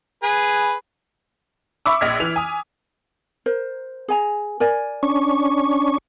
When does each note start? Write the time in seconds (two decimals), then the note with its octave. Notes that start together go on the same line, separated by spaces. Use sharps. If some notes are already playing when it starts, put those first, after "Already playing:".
0.23 G#4 B4
1.86 E5 B5 C#6 D6 E6
2.01 A#1 D#5 F6 G#6 B6
2.20 E3 F7
2.36 G#5 D#6
3.46 A#4 C5
4.08 G#4 G#5 A#5
4.60 A#4 D5 G#5
5.03 C#4 D4 C#6